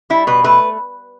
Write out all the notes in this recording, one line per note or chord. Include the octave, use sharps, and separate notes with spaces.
G3 E4
B2 B4
A3 B4